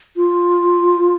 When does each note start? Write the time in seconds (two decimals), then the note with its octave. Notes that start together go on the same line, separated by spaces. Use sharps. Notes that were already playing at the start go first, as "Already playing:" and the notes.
0.16 F4